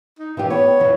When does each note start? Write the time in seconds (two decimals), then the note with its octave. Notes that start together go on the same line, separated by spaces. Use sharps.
0.19 D#4
0.37 A#2 E3 F4 G4
0.50 B3 C#5
0.80 F2 E3 F3